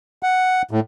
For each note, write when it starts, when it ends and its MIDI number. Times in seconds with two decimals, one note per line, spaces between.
0.23 0.62 78
0.71 0.80 45